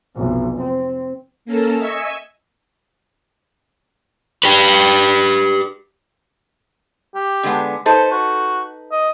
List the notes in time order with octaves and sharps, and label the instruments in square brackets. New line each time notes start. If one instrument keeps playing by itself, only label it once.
[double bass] F1 B1
C4
[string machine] A#3 C#4 A4 A#4 A5
D#5 E5 G#5 C#6 E6
[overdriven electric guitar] G4 B4
[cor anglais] G4
[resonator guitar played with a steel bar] D3 G#3 B3
[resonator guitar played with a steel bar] D#4 A4 B4 [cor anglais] C5
[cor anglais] F#4
D#5